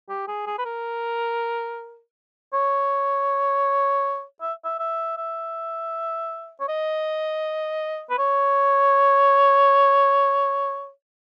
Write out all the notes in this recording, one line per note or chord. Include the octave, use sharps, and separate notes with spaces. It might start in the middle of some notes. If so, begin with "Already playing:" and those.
G4
G#4
G#4
B4
A#4
C#5
E5
E5
E5
E5
C#5
D#5
B4
C#5